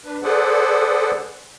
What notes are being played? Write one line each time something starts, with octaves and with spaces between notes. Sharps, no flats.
D4 B4
G#4 A4 B4 C5 D5 F#5